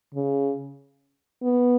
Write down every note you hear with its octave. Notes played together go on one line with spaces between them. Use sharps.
C#3
B3